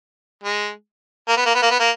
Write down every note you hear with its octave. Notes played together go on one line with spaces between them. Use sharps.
G#3
A#3
B3
A#3
B3
A#3
B3
A#3